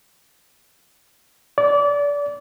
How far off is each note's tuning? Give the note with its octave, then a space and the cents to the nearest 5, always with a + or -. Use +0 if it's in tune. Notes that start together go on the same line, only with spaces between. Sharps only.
D5 -25